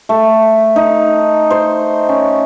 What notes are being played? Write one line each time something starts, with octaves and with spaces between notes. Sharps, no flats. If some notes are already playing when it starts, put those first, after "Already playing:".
A3
D#4
C5
C#4